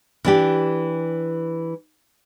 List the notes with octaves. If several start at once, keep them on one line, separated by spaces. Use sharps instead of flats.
E3 D4 G4